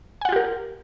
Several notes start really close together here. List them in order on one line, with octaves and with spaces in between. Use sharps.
G#5 F#5 F4 G4 A#4